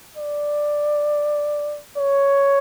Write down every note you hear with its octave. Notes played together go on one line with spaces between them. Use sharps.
D5
C#5